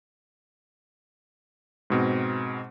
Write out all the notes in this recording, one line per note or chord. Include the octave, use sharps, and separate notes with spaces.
G#2 B2 C4